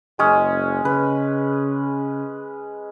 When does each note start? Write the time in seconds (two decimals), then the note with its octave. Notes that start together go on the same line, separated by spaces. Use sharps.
0.19 F#1 G#3 C#4 G#4
0.85 C#3 B4